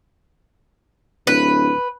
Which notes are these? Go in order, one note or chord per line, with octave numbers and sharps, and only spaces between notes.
D1 B4